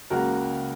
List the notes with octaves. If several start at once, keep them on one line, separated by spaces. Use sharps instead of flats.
C#2 C#3 F#3 A#3 F#4 A#4